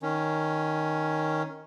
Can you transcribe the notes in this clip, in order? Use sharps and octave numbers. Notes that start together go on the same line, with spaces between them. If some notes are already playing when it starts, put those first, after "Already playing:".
D#3 C#4